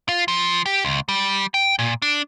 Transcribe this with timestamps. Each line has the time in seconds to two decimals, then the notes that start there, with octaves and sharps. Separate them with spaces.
0.09 F4
0.28 F3
0.66 G4
0.85 C#2
1.09 G3
1.54 G5
1.79 A#2
2.02 D4